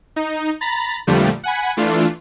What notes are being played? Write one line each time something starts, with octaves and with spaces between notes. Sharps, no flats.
D#4
A#5 B5 A6
F2 A#2 D3 F3 G3 A3
F#5 G#5 B5
E3 A3 D4 F4